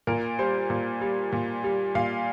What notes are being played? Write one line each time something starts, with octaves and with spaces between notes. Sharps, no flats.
A#2 A#4
G3 C5
A#2
G3
A#2
G3
A#2 F5